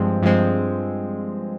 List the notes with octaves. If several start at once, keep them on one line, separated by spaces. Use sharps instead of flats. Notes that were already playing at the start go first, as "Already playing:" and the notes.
Already playing: G2 F3 G#3 C4
G2 F3 G#3 C4